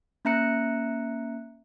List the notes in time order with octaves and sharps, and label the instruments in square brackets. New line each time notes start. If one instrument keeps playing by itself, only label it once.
[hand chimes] A#3 C#4 E5 A#5 F#6 C#7